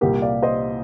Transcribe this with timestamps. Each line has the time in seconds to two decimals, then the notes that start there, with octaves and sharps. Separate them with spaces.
0.01 C2 A#2 G4 A#4
0.22 D5 F5
0.43 C5 D#5